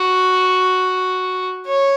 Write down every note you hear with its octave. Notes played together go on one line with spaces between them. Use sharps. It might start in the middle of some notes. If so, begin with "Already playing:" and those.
Already playing: F#4
C#5